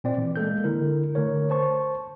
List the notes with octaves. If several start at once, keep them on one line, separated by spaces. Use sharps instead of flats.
A#2 C4 D5
E3
G#3 A#3 A4 G6
D3 E4 A#4
D3 A3 A#4 C#5
C5 A5 C#6